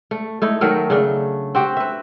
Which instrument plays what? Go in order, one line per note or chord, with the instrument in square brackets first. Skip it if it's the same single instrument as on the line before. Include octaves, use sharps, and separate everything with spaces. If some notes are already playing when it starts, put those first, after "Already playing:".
[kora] A3
A3 D#4 E4
D#3 F#3 A3 A#4
C#3 A3 D4
C4 F#4 G4
B4 E5